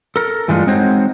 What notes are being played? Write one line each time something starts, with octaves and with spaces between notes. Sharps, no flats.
A4 A#4
G2 E3 G#3 A3 D4 F4
G#3 C4 D#4 F#4 C5 C#5